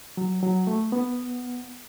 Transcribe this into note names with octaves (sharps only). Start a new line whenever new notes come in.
F#3
F#3
A3
B3